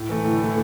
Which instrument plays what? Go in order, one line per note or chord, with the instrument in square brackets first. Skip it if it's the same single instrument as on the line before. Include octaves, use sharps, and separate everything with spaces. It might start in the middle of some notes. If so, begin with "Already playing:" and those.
Already playing: [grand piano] A2
E3 A3
[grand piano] A2 [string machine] D3
[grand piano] E3 A3